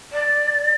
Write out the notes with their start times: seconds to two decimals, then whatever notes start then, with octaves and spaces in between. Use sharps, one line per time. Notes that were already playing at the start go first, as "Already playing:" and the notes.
0.12 D5